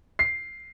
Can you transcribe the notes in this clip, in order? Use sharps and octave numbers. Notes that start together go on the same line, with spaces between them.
C7